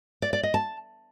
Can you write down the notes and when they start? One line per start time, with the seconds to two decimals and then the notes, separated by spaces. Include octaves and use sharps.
0.22 D5
0.33 D5
0.43 D#5
0.54 A5